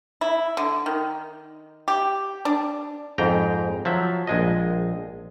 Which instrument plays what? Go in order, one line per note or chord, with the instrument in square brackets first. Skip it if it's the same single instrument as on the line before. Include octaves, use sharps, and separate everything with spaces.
[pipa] E4
D3
D#3
G4
D4
[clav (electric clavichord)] F2 G#2 G5 A#5
F3 F#3 E5
A#1 G#3 D#5